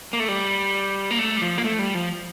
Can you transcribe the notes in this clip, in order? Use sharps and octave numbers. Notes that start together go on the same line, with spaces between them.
A#3
A3
G3
A#3
A3
G3
F3
A#3
A3
G3
F3